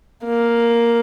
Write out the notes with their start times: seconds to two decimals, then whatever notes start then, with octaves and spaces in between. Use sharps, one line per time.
0.25 A#3